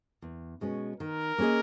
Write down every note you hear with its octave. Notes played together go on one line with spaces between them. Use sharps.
E2
B2 G#3 C#4
D#3 A#4
A#3 C#4 G#4 D#5